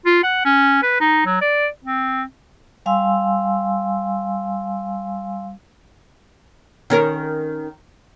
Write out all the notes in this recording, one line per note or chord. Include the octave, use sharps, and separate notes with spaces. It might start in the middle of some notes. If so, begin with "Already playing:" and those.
F4
F#5
C#4
B4
D#4
F#3
D5
C4
G3 F5 G#5 C6 E6
D#3 C#4 A#4